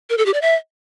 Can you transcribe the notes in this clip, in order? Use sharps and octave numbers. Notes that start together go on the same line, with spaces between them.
A#4
A4
G4
D5
E5